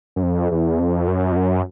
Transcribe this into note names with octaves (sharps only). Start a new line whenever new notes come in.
F#2
F2
E2
F2
F#2
F2
F#2